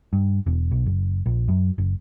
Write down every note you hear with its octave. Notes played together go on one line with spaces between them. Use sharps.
G2
E1
B1
F#1
A#1
F#2
F#1